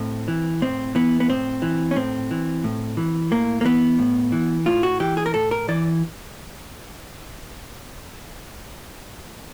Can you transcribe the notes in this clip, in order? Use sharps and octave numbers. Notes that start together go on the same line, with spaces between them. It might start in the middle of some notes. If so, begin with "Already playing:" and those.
Already playing: A2 C4
E3
A2 C4
E3 B3
B3
A2 C4
E3
C#4
A2 C4
E3
A2
E3
A2 A#3
A#3
E3 B3
A2
E3
A2 F4
F#4
E3 G4
G#4
A#4
A2 A4
A#4
E3 D5